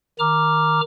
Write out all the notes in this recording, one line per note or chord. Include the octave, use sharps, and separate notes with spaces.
D#3 A#5 D6 F6